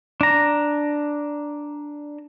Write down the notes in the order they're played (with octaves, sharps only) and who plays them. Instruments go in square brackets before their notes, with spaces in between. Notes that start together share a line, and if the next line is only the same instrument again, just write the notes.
[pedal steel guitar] D4 A#5